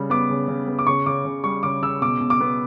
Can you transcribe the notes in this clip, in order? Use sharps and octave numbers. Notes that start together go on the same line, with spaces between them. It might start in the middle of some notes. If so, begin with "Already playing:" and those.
Already playing: C#3 G3
B3 D6
C#3
C#3
B3
D6
C#3 C#6
C#3 D6
C#3
G3 C#6
C#3 D6
C#3 E6
B2 D6
B2
D6
B3